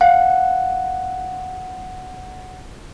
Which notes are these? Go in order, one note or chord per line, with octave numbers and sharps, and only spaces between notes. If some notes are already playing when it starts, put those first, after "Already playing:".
F5 F#5